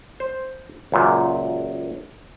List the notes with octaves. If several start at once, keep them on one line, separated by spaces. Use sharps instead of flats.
C5
C#2 F#2 A#2